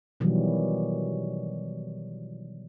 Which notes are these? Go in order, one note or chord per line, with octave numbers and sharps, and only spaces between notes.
B2 D#3 E3 F#3 G3